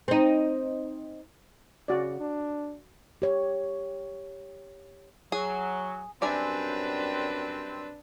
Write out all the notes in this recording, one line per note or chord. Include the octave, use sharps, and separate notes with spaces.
C4 D#4
C#3 F#4 D5
D4
G4 C#5
F#3 G#4
F#2 G3 C4 D4 B4 D5 E5 G#5